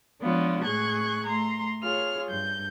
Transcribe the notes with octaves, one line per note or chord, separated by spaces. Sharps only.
F3 G#3 B3 D4 F4 C#5
A2 G#4 C#6 F#6 G#6
A3 A#5 C6
F4 G#4 C#5 F6
G2 G6